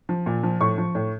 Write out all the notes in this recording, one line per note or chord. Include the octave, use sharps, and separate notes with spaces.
F3
A#2
F3
A2 C#6
F3
A2